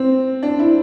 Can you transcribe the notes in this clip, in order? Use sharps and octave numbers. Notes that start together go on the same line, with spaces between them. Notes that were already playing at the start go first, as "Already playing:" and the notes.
Already playing: C4
D4
E4